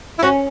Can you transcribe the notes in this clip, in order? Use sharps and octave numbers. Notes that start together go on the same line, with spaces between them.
E4
C#4 F#4